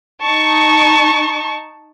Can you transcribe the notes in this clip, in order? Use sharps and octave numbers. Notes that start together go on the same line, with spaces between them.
D#4 A5 C#6